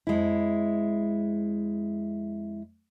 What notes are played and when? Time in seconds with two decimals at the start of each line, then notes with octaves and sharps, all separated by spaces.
0.07 F2 G#3 E4